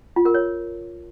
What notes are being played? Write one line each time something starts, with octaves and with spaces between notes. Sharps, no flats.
F4
A#4
C#5